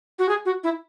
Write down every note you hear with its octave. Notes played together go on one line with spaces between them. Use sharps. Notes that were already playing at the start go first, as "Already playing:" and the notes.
F#4
G#4
F#4
E4